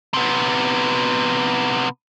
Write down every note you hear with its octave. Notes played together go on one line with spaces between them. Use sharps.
C3 B3